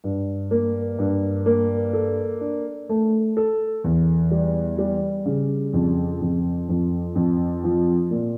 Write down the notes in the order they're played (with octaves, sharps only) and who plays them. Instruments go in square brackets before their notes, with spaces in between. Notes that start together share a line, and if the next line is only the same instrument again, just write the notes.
[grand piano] G2
A#3
G2
A#3
A4
D4
A3
A4
E2
G3
G3
C#3
F2
F2
F2
F2
F3
A#2